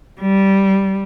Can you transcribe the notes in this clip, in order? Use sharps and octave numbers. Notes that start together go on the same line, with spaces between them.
G3